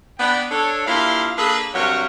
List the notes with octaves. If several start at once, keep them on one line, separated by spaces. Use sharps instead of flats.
B3 D4 G5
D4 A4 C#5
A#3 D4 E4 F4 G4 F5
A#3 D4 G#4 A4 B4
G2 C3 F#3 F#4 A#4 C#5